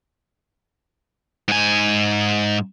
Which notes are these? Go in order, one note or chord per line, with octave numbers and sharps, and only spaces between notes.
G#2 G#5